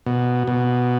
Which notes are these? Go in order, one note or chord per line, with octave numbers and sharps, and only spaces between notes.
B2
B2